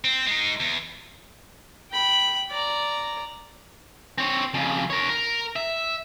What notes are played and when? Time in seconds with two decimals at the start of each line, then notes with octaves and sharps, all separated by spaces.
0.05 C4
0.27 G#3 D#4
0.60 E2
1.91 G5 B5
2.51 D5 A#5
4.18 C4 C#5
4.54 F2 C#3
4.90 A#4 C#5
5.10 A#4
5.56 E5